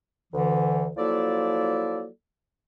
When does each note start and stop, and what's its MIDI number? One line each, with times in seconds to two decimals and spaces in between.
0.33 0.88 38
0.33 0.88 50
0.33 0.88 52
0.97 2.06 53
0.97 2.06 54
0.97 2.06 58
0.97 2.06 64
0.97 2.06 69
0.97 2.06 74